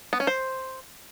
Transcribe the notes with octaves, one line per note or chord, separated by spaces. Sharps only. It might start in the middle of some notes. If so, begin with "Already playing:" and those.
B3
C#4
C5